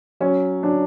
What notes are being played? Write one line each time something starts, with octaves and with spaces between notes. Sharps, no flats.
F#3 C#4
F#3 D4